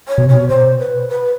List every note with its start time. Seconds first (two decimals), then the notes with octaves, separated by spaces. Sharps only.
0.08 C#5
0.18 B2
0.26 C3 C#5
0.34 B2
0.49 C5
0.79 B4
1.09 B4